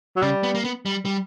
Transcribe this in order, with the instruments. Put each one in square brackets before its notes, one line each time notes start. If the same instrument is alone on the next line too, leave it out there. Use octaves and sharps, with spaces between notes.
[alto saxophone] F#3
[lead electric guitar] C#3 [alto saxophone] G3
[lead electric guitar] B3
A#3
B3
G3
G3